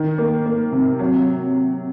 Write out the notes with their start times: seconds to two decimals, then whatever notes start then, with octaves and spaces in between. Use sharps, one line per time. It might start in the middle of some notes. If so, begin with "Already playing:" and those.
Already playing: D#3
0.18 A#3
0.46 A#3
0.72 C3
0.99 F#3